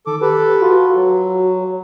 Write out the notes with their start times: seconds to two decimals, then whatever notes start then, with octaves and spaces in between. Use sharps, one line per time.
0.07 D#3 A4 D6
0.22 G4 A4 B4
0.61 F4 F#4
0.96 F#3